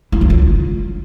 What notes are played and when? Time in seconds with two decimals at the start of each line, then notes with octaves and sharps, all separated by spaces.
0.12 E4
0.21 F#3
0.30 F4